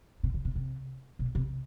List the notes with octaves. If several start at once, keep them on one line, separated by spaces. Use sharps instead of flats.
C3
C#3
C3
C3
B2
C3